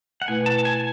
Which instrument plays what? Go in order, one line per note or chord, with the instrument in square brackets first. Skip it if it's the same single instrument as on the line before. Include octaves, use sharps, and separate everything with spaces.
[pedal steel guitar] F#5
[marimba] B2 A3 E4 B4 [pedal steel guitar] G#5
[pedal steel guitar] A5
G#5